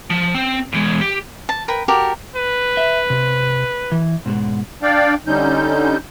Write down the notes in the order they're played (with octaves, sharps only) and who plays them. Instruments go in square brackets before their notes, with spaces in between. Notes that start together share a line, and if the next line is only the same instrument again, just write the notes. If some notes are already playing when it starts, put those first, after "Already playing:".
[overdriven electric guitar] F3
C4 G5
E2 G#3
G4
[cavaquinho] A5
A#4 B4 G5 B5
F#4 G4 A4 A#4
[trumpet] B4
[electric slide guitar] E5
C3
E3
G#2 B2 G#3
[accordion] D4 D5 F5 G5
D3 G3 C#4 D#4 G6